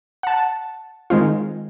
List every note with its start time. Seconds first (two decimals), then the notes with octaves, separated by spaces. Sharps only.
0.23 F#5 A5
1.10 D#3 G#3 C4 F4